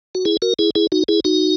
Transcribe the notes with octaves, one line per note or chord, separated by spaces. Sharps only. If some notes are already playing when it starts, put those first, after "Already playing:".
F#4
E4 G#4
F#4 A#4
E4 G#4
E4 G#4
D#4 F#4
E4 G#4
D#4 F#4